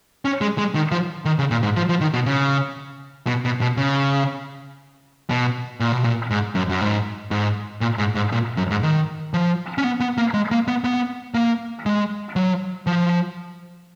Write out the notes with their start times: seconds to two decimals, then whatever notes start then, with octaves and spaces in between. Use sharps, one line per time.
0.25 C#4
0.41 G#3
0.58 G#3
0.75 D#3
0.92 F3
1.25 D#3
1.39 C#3
1.51 A#2
1.63 G#2
1.76 F3
1.89 F3
2.01 D#3
2.14 B2
2.26 C#3
3.27 B2
3.45 B2
3.61 B2
3.77 C#3
5.30 B2
5.80 A#2
5.92 B2
6.04 A#2
6.31 G#2
6.55 F#2
6.69 F#2
6.81 G#2
7.31 G#2
7.81 A#2
7.98 G#2
8.15 G#2
8.32 A#2
8.57 F#2
8.71 G#2
8.83 D#3
9.34 F3
9.78 C#4
9.84 B3
10.00 B3
10.18 A#3
10.34 G#3
10.51 A#3
10.68 B3
10.84 B3
11.34 A#3
11.86 G#3
12.36 F#3
12.87 F3